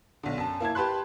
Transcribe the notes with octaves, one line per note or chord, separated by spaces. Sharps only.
B1 D3
F#2 A5
A#3 E4 A5 G#6
G4 B4 A5 B5 C6 F#6